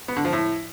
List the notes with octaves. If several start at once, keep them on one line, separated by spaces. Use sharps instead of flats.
B3
D3
F3
A2